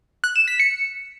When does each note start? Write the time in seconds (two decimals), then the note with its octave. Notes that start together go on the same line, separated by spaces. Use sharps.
0.24 F#6
0.36 E7
0.48 B6
0.60 C#7